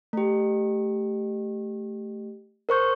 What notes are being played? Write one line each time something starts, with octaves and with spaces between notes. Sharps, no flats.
A3 G4
A#4 C5 C#6 G6